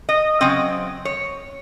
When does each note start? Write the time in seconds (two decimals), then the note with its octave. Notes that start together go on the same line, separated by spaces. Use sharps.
0.09 D#5
0.41 C#3 F#3 C4 D#5
1.05 C#5